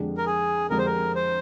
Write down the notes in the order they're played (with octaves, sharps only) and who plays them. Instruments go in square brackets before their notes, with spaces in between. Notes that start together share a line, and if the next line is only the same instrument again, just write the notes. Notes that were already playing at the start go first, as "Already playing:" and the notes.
Already playing: [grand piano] F2 D3 G#3 D4 G4
[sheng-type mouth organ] A#4
G#4
[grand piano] F2 D3 G#3 D4 G4 [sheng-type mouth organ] A#4
[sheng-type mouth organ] C5
A#4
C5